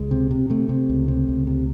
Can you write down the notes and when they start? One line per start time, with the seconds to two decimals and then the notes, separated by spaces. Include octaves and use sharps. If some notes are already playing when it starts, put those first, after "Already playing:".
Already playing: C#2 G#3
0.11 C3
0.31 C3
0.50 C3 A3
0.69 C3
0.89 C#2
1.08 C3
1.29 C#2
1.47 C3